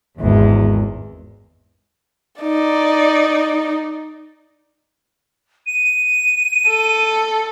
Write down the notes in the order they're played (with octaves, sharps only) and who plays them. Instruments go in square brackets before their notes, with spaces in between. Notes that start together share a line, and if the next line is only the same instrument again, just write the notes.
[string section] G#1 E2
[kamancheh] D#4 D5
[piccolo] D#7
[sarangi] A4